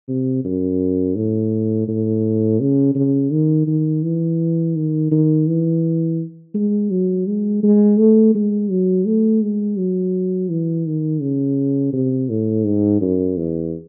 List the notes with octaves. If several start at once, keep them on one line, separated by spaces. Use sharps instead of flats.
C3
F#2
A2
A2
C#3
C#3
D#3
D#3
E3
D#3
D#3
E3
G#3
F#3
G#3
G#3
A3
G#3
F#3
A3
G#3
F#3
E3
D#3
C#3
C3
A2
G#2
F#2
E2